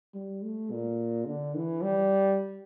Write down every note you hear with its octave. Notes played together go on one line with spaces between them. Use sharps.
G3
A3
A#2
D3
E3
G3